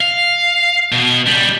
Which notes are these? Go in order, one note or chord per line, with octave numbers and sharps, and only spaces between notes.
F5
B2
C#2 G3